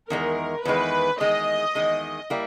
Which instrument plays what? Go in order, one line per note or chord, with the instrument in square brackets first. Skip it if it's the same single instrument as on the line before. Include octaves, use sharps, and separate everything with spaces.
[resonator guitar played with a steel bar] E2 D#3 G#3 [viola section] A#4
[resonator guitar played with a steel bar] E2 D#3 G#3 [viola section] B4
[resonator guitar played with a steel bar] E2 D#3 G#3 [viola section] D#5
[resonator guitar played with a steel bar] E2 D#3 G#3
G3 A#3 E4